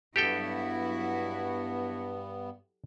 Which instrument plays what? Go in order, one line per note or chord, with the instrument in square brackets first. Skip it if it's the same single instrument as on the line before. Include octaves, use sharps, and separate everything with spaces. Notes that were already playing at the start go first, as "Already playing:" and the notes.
[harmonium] G2 B3 [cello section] F#3 E4 F#4 [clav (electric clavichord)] G4 A4 G5